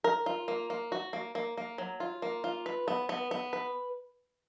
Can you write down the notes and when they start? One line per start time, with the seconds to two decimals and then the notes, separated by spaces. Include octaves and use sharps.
0.04 A#4
0.26 F4
0.48 A#3
0.70 A#3
0.92 F#4
1.13 A#3
1.35 A#3
1.57 A#3
1.78 F#3
2.00 F4
2.22 A#3
2.44 F4
2.66 B4
2.88 B3
3.09 B3
3.31 B3
3.53 B4